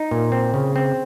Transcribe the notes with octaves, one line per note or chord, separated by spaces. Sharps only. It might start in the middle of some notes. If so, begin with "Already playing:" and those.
Already playing: D#4
A#2
C4
C#3
C4